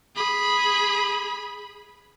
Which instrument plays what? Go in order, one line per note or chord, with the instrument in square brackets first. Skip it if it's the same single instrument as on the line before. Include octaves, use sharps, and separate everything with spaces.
[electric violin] G#4 B5